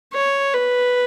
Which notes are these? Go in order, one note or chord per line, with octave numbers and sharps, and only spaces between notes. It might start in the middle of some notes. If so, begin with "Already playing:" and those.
C#5
B4